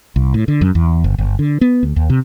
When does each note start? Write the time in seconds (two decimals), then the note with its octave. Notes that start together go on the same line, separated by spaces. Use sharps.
0.16 C2
0.34 A2
0.48 D3
0.61 F#2
0.75 E2
1.04 G1
1.18 G1
1.39 D3
1.61 B3
1.83 D2
1.96 D#2
2.10 C3